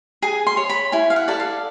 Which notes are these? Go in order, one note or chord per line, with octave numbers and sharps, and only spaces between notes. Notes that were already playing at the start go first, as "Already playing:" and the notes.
G#4 G#5
C6
C#5
B5
E4 G#5
F5
F#5
A4 D5
F5